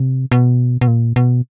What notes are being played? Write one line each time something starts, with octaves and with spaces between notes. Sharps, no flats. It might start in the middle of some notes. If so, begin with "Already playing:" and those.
Already playing: C3
B2
B2
A#2
B2